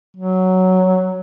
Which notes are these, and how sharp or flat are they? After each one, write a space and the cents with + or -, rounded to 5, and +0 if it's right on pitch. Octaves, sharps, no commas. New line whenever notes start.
F#3 +5